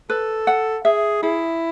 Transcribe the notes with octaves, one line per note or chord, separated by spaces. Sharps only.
A4 B4
F#5
G#4 E5
E4 G#4